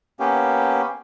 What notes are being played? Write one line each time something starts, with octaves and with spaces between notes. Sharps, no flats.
A#3 B3 C#4 G4